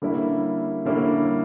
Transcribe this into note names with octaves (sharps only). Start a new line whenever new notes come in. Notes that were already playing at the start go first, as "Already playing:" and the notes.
D3 G3 A#3 C#4 E4
D3 G3 A#3 C#4 E4